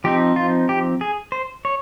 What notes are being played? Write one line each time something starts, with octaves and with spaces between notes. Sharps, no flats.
F3 C4 D#4 G4
F4
G4
G#4
C5
C#5